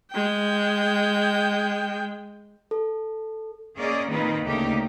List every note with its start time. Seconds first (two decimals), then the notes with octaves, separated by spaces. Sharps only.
0.12 G#3 G5
2.71 A4
3.78 A#3 C#4 G#4 D5 D#5
4.12 A#2 D#3 A#3 C4 D#4 B4
4.45 D2 C#3 A3 A#3 D#4 G4